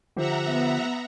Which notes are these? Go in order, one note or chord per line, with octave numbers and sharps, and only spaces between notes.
D3 F3 G4 C5 E5 F#5 A#5
B3